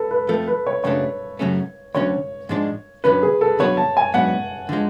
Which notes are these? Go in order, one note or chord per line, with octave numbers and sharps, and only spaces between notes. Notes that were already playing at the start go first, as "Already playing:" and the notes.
Already playing: A4 B4
B4
F2 F3 A3 A4
B4
C#5
F#2 C#3 F#3 A3 D4 C#5
F#2 C#3 F#3 A3 C#4
D2 D3 F#3 C#4 C#5
G#2 F3 G#3 D4
F#2 D3 F#3 C#4 B4
G#4
A4
D3 F#3 B3 F#4 C#5
A5
G#5
G#2 F#3 B3 D4 F#5
D3 F3 G#3